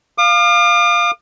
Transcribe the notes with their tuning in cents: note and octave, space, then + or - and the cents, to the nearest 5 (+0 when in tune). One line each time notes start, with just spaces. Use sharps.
F5 +0 D6 +45